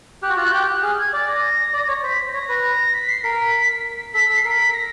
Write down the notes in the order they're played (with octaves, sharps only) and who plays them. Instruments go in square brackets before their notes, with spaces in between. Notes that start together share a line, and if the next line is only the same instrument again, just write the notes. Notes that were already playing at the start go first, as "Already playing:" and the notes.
[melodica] G4 [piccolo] F#6
[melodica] F#4
[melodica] F4 [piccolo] F#6
[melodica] F#4
[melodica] G4 [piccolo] G6
[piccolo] F#6
[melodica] G#4 [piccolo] F6
[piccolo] G#6
[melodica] D5 [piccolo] A6
[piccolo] A#6
[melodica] D5
C#5
[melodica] C5 [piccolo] B6
[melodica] C#5 [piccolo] A#6
[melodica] B4
[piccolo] A#6
B6
C7
[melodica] A#4 [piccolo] B6
[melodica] A4 [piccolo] B6
[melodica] A4
[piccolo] C7
[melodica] A#4 [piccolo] B6
[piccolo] A#6